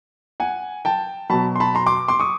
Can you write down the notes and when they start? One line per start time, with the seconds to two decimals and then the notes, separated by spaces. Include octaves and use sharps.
0.40 F#5 G#5
0.85 G5 A5
1.30 B2 F#3 A5 B5
1.56 C6
1.60 A5 B5
1.75 A#5 C6
1.86 C6 D6
2.08 C6 D6
2.20 C#6 D#6